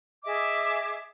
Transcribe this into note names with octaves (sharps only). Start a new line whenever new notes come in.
G#4 D#5 E5 D6